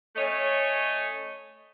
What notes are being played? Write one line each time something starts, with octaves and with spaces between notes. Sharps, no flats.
A3 C#4 C#5 D#5